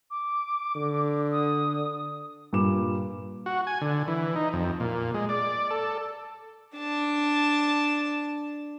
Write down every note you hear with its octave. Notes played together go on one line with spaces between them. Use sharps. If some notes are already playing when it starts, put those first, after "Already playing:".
D6
D3
D#6
G2 A#2 D6 E7
F#4
G#5
D3
E3
D#4
F2
A#2
G#3
D5
A4
D4 A5